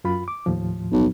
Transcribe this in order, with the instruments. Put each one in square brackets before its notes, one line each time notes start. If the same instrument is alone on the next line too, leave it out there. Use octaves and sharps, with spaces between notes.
[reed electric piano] F#2 F4 B5
D6
D#2 A2 F3
[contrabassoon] B1